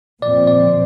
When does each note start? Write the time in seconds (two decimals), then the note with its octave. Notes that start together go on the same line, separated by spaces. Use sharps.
0.22 A#2 F3 C4 D5
0.47 D5